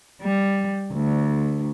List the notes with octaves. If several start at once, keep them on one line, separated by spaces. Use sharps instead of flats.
G3
D2